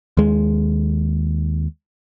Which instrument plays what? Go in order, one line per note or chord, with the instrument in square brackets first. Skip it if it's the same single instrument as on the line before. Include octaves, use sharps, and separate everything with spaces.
[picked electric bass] D#2 G#3